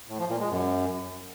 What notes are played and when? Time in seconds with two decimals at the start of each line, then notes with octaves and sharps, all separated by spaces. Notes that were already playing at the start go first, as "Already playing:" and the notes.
0.08 A2
0.19 F3
0.29 A#2
0.40 G#3
0.50 F#2